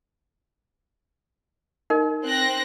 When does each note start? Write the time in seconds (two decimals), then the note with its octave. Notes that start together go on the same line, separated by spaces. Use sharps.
1.90 D#4 A#4 D#5
2.25 C4 F#6 A#6